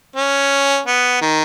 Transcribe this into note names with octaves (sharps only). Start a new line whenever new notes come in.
C#4
B3
D#3